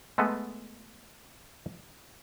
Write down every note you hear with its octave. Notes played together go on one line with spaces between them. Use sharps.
G#3 A3 B3 A4 B4